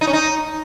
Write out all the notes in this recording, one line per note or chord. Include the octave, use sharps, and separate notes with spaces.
D#4
C#4
D#4